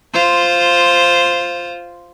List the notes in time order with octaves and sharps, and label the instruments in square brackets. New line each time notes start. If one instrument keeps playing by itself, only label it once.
[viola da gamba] F4 C5